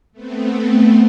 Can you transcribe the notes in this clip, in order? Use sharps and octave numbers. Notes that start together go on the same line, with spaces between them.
A3 B3 C4